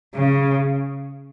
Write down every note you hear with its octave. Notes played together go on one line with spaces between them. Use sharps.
C#3